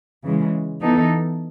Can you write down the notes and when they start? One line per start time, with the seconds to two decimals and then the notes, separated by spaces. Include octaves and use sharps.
0.25 C#3 E3 G#3
0.81 E3 B3 D#4 A4